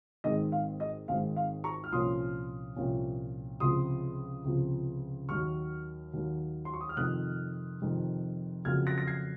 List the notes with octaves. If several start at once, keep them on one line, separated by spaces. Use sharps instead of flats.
G#1 G#2 D#3 G#3 C4 D#5
F5
D#5
G#1 G#2 D#3 G#3 C4 F5
F5
A#5 C#6
F6
C2 A#2 F3 A#3 C#4 C6 D#6
C2 A#2 F3 A#3 C#4
C#2 C3 F3 C6 D#6
C#2 C3 F3
D#2 D#3 F#3 C#6 F6
D#2 D#3 F#3
C6
C#6
D#6
F6
F2 C3 D#3 D#6 F#6
F2 C3 D#3
F2 C#3 F#3 A#3 F6 G#6
F#6 A#6
A#6
G#6 C7